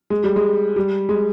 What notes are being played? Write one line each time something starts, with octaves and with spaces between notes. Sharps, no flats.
G#3
G3
G#3
G3
G#3